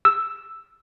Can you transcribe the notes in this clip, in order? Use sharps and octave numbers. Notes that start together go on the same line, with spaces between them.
E6